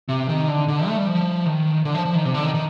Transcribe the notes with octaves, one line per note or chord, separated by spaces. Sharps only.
C3
D#3
D3
D3
A3
G3
F3
D#3
D3
F3
F3
D#3
C3
D3
D#3
D#3